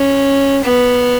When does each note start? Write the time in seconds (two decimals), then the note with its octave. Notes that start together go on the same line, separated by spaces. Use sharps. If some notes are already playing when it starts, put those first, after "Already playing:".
Already playing: C#4
0.64 B3